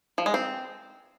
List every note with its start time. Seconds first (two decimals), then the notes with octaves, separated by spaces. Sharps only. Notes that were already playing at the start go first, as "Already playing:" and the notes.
0.18 F3
0.26 G#3
0.34 C4